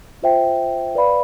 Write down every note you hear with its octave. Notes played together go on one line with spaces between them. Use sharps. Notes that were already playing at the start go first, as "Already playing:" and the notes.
F4 C5 E5 G5
B4 D5 F5 B5